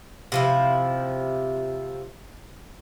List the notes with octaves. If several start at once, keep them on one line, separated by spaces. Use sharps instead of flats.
C3 F3 E4